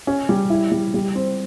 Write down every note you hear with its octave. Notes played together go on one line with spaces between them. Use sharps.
C#4
G3
E4
G3
G3
C4